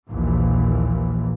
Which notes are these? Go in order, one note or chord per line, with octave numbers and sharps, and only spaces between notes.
A#1 D#2 A#2 E3